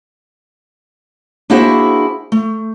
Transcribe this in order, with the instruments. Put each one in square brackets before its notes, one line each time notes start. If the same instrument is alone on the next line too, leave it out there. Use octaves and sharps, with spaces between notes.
[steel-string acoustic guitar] A#3 D4 E4 F#4 G#4 C5
A3